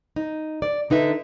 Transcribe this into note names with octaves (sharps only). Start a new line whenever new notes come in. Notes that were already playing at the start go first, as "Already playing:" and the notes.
D#4
D5
D3 D#4 B4 E5